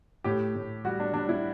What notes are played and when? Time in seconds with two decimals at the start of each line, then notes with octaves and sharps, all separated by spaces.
0.24 A2 G4
0.55 A2
0.84 G3 F#4
1.00 D4
1.13 G3 D4
1.29 E4